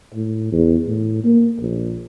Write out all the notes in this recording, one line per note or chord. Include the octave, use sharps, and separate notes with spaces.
A2
E2
A2
A#3
A#1